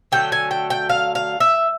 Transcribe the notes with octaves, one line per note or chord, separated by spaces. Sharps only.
D3 F#3 A3 G5
G#5
G5
G5
F5
F5
E5